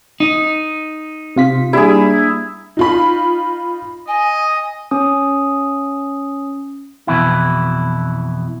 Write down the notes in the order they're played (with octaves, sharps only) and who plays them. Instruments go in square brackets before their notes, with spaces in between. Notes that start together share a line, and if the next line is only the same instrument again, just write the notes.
[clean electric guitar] D#4
[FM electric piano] C3 F4 B6
[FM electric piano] G3 [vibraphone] A#3 D4 [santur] E4 G#4
[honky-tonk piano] D#4 F4 B5
[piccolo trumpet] D#5 [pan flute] G#5
[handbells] C#4 D#6
[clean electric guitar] F2 B2 E3 E4